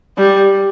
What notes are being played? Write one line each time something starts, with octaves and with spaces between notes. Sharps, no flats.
G3